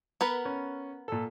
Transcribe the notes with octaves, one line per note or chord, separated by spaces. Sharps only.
B3 A#4 B4
C#4
A#2 A4